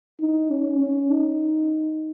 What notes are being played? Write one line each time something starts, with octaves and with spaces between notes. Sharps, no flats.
D#4
C#4
C#4
D#4